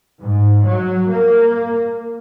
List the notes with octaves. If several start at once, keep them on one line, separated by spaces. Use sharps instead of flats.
G#2
F#3
A#3